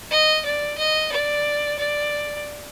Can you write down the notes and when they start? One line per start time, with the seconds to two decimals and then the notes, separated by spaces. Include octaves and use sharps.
0.11 D#5
0.45 D5
0.78 D#5
1.12 D5
1.78 D5